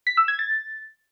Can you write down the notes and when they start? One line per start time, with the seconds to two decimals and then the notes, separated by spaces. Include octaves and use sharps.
0.07 B6
0.17 E6
0.28 G#6
0.39 A6